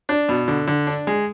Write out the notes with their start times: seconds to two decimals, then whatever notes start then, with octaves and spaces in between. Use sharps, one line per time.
0.09 D4
0.29 B2
0.48 D3
0.68 D3
0.87 D4
1.07 G#3